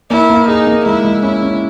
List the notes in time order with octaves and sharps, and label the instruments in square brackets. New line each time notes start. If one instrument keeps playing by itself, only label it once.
[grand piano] A#3 [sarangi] E4
[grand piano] A#3
[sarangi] D#4 [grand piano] G#4
[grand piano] A#3
[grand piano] G#3 [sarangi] E4
[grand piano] G#3
[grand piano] C#4 [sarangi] E4
[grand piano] C#4